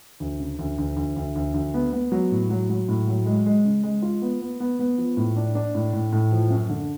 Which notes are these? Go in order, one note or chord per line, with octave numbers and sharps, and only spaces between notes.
D2
C#3
D2
D2
D2
D2
D2
D2
B3
B3
F#3
A2
F#3
F#3
A2
F#3
G#3
G#3
C#3
G#3
F4
B3
B3
B3
B3
F3
A2
D4
D4
A2
A2
A2
F3
F#2
D3